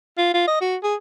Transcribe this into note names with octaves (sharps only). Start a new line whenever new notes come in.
F4
F4
D#5
F#4
G#4